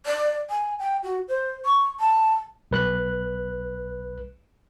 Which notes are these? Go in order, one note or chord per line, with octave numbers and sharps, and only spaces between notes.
D5
G#5
G5
F#4
C5
C#6
A5
B1 B4 F#6